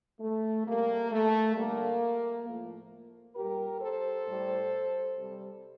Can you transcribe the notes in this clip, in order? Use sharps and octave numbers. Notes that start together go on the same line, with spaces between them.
A3
C3 G3 A#3
A3
D3 G3 A#3
A2 F3 A3
A#2 G3 G4 A#4
A4 C5
A2 G3
C3 G3